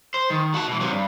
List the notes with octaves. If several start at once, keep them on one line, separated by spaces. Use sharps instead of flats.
C5
D#3
F#4 A5
B2 E3
C3 F#3
G2